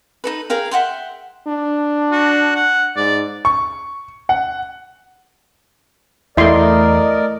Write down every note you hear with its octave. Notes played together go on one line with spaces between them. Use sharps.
D#4 A4 B4
G#4 A#4 F5 G5
E5 F#5 G5 C6
D4
F#4
F#5
G#2 D5
C#6
F#5
E2 A3 E4 A#4 D5 D#5 C6